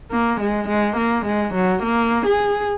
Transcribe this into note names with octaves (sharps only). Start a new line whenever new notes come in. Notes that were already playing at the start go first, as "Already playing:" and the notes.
A#3
G#3
G#3
A#3
G#3
F#3
A#3
G#4